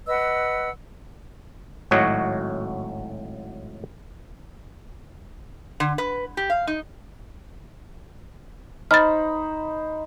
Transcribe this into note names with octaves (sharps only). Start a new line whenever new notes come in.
B4 D#5 F#5 E6
G#1 A2 F#3 F#4 C#5 D#5
D3
B4
G4
F5
D#4
D#4 C5 B5 F6 A6